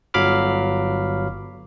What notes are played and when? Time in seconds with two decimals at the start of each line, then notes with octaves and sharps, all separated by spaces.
0.14 G1 F#3 F5 B5 D6 F6